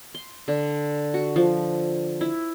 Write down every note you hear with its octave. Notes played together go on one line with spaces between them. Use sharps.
C6
D3
F#4
F3
E4